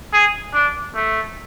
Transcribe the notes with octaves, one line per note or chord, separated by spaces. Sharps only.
G#4
D4
A3